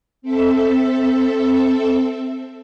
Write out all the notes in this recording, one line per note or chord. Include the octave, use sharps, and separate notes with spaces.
C4 A4 E5